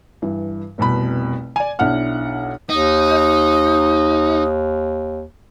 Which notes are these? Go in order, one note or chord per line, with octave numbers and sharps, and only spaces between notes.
G2 E3
F1 C2 B2 B5
D5 G#5
B1 D4 E4 F#5 F6
D#2 D#4 D#6